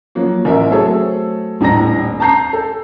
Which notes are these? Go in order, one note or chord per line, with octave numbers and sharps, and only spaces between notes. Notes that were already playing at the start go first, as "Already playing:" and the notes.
F3 F#3 A#3 F#4
A1 A#4 E5
F#3 A3 C4 G#4 A4 C#5
D#1 A2 D4 A#5 A#6
A5 A#5 G6 C7
A4